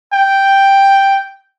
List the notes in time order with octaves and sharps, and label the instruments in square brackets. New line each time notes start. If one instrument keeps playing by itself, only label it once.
[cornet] G5